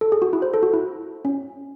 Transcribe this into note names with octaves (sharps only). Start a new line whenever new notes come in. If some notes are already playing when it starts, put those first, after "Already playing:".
A4
G#4
F#4
E4
C5
A4
F#4
E4
C#4